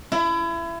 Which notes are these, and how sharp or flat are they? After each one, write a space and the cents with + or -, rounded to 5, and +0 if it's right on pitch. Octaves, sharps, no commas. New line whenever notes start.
E4 +30